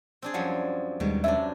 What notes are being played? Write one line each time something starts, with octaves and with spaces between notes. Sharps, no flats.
C4 D4 G#4
F#2 F3 G3 F#5
D#2 B2 D#3 G3 G#3 F#4
F#2 C3 D4 E5